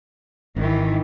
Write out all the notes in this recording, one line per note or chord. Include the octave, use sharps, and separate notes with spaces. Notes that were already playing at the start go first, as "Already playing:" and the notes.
G#1 D#3 E3